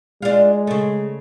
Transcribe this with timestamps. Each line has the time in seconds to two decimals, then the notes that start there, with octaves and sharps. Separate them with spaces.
0.22 G#3 D4 F4
0.67 C#3 A3